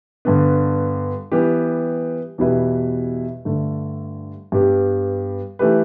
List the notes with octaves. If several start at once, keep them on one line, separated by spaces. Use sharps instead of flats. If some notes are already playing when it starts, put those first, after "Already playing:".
G2 D3 B3
E3 G3 B3 G4
E2 B2 G3 E4 B4
G2 D3 A3
G2 G3 B3 G4
E3 A3 G4 B4